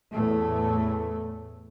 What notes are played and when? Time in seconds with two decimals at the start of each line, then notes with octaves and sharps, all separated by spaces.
0.13 E2 A2 A3